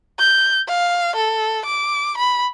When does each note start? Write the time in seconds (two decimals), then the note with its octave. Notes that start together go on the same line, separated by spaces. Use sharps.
0.20 G6
0.68 F5
1.15 A4
1.65 D6
2.18 B5